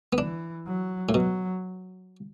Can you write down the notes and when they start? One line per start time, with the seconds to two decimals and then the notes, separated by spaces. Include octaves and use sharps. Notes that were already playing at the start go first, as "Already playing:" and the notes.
0.13 B3
0.18 E3 D4
0.66 F#3
1.09 A2
1.14 B2 F#3